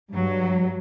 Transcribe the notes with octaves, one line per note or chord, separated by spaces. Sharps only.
G2 F#3